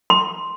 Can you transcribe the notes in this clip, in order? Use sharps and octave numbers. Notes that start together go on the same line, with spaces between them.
C6